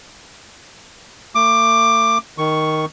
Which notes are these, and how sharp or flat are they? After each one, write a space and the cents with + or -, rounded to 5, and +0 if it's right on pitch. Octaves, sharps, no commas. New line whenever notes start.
A3 +40 D6 +15
D#3 +0 C#6 +0